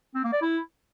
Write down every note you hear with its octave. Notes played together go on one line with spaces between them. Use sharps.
C4
A#3
D5
E4